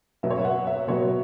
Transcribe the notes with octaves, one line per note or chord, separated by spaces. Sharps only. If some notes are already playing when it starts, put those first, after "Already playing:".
B2 F#3 B3 E5
C#5
E5
F#5
E5
B2 F#3 B3 C#5